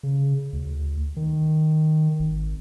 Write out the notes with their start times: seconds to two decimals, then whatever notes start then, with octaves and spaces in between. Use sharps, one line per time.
0.03 C#3
0.53 D2
1.17 D#3
2.20 G#1